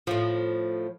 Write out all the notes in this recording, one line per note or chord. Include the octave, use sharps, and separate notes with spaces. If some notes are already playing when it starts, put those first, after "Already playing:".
A2 F3